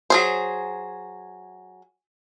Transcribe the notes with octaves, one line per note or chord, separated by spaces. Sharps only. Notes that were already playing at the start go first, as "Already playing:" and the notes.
F#3 G#4 C5